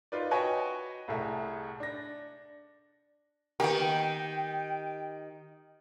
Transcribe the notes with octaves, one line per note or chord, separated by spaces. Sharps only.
D#4 F4 B4 D5
F#4 B4 C#5 D#5 G5 G#5
C2 A2 G#4 A4 E5
D4 A#6
D#3 A#3 B3 G4 G5